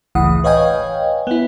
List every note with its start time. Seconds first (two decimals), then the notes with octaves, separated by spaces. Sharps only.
0.15 G1 C#2 A2 E3 F#5 D#6
0.44 B4 C#5 D#5 F5 G5 G#5
1.27 B3 E4